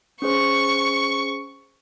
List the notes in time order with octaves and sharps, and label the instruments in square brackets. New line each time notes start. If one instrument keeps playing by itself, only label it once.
[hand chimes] C#4 G#4 C5 [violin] C#6